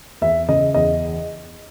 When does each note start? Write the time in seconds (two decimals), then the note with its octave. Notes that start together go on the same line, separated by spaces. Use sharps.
0.21 E2 E5
0.48 C#3 D#5
0.74 E2 D#5